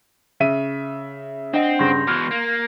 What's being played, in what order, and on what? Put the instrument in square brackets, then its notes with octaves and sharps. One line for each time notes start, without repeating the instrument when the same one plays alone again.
[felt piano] C#3 E5 D#7
[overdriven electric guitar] C4 [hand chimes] D4 F#5 [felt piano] D#5
[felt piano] G2 C#3 [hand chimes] C6 G6 A#6
[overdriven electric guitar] B2 E3 [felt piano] F6
[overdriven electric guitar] A#3